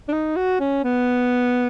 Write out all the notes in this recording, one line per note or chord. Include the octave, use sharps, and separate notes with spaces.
D4
D#4
F#4
C#4
B3